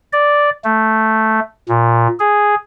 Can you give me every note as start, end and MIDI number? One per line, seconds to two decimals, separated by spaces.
0.13 0.50 74
0.64 1.40 57
1.69 2.08 46
2.20 2.55 68